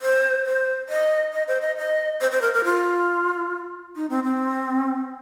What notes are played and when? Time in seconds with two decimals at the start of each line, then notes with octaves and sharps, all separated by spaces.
0.02 C5
0.46 C5
0.89 D#5
1.33 D#5
1.48 C5
1.61 D#5
1.77 D#5
2.21 C5
2.31 C5
2.42 A#4
2.54 A#4
2.65 F4
3.96 D#4
4.10 C4
4.24 C4